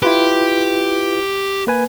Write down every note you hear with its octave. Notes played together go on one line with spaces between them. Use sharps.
E4 F4 G4 B4
A#3 B4 G#5